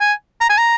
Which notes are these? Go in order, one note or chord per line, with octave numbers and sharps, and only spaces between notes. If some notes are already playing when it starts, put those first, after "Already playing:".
G#5
A#5
G#5
A#5